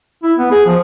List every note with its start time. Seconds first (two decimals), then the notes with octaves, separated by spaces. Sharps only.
0.23 E4
0.38 B3
0.52 G#4
0.66 F3